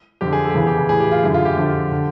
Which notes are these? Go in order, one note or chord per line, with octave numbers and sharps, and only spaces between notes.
F2 D3 G4
G#4
A4
G4
E2 C#3 E3 G#4
G4
G#4
A2 E3 G#4
G4
F4
F#2 D3 E4
F4
G4
F2 D3
D3